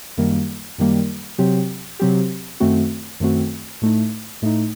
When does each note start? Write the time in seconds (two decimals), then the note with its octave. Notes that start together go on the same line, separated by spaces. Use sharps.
0.17 F#2 D#3 G3 A#3
0.78 F#2 D#3 G3 A#3
1.38 C3 F#3 C4 G4
2.00 C3 F#3 C4 G4
2.60 F#2 D#3 A3 C4 F#4
3.20 F#2 D#3 A3 C4 F#4
3.82 A2 A3 D#4
4.42 A2 A3 D#4